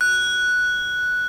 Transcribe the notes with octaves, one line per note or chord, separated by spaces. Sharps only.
F#6